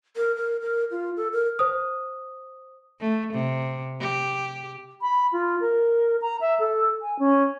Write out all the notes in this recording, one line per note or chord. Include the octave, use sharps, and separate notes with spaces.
A#4
A#4
A#4
F4
A4
A#4
C5 D#6
A3
C3
G4
B5
F4
A#4
A#5
E5
A4
G#5
C#4